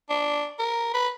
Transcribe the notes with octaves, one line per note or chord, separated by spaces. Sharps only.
D4
A#4
B4